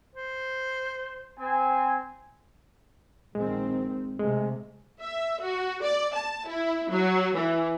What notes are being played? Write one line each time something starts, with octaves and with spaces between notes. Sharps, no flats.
C5
C4 G#5
A#1 D#3 G#3 C4
C3 G#3 A3
E5
F#4
D5
A5
E4
F#3
E3